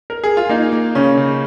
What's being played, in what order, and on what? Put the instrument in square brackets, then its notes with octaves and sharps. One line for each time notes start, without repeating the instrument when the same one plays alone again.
[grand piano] A#4
G#4
F4
[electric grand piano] A#3 [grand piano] D#4
[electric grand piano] A#3
[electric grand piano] C#3 [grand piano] C#4
[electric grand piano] C#3